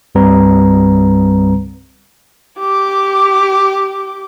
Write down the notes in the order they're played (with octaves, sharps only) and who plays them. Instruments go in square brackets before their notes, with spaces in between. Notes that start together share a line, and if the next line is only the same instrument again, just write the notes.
[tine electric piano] C2 G2 G3 C4 B4 A#5
[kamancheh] G4 D6